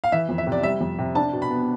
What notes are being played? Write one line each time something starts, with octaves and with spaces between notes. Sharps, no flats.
F5
E3 E5
F2
E5
C3
D5
G3 E5
F2
C3
D4 A5
B2
B5
B3